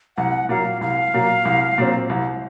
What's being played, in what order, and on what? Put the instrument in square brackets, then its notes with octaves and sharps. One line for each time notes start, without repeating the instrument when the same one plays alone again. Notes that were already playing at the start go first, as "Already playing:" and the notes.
[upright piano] C2 [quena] F#5
[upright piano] A#2 F#3 A#3 [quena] F5
[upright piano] C2 [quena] F5
[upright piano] A#2 F#3 A#3
C2
A#2 F#3 C4
C2